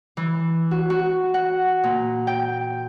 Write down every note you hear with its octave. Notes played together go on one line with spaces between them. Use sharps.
E3
F#4
F#4
F#5
A#2
G5